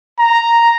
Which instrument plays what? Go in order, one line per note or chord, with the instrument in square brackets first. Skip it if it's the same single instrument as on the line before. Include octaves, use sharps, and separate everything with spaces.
[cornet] A#5